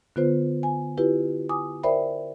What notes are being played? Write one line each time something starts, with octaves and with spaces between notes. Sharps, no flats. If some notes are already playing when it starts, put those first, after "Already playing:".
D3 B3 F4 B4 C5
G#5
E4 F4 G4 B4
G#5 D6 D#6
A#4 C5 D5 E5 G5 B5